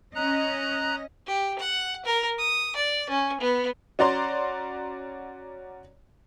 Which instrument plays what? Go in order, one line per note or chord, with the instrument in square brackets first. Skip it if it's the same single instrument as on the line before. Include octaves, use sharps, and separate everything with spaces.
[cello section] C#4 D#5 [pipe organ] A#5 F#6
[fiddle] G4
F#5
A#4
D#6
D5
C#4
B3
[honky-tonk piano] C#4 F#4 D5 A#5 C6